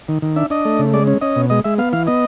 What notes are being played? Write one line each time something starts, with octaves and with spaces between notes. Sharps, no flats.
D#3
D#3
D4 E5
D4 D#5
A3
C#3
G#3 D5
C#4
C#4 D#5
B2
G#3 D#5
G#3 E5
B3 F5
E3 F5
B3 D#5